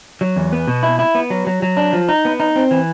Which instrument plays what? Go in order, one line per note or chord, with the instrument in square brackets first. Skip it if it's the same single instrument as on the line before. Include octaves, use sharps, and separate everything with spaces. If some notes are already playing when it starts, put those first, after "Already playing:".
[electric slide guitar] F#3
E2
B3
B2
E4
E4
B3
F#3
F#3
F#3
D4
F3
D#4
B3
D#4
C4
E3